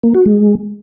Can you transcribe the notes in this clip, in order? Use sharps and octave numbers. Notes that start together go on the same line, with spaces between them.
A#3
F#4
G#3